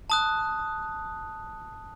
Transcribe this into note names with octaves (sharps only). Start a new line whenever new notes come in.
A5 D#6 F#6